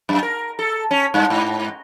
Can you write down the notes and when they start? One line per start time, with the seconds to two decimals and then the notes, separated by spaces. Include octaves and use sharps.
0.09 F#2
0.23 A#4
0.59 A4
0.91 C#4
1.14 G2
1.30 G#2